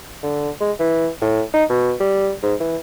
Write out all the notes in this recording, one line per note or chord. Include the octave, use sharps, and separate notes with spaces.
D3
G#3
E3
A2
D#4
B2
G3
G#2
E3